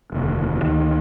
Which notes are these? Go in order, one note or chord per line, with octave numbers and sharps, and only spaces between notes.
F1 D#2 D3
D2 D3 D#3